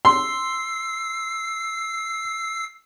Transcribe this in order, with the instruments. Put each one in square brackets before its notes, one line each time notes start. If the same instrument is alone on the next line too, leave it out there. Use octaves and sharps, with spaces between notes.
[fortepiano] C6 [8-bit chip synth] E6 C7